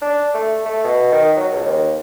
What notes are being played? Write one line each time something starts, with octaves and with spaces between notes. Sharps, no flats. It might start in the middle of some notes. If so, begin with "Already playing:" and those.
D4
A3
A3
B2
D#3
F#3
C#2
D#2